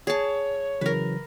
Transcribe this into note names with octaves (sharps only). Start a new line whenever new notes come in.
G#4 C#5 A5
C#3 E3 F#3 A#4 B4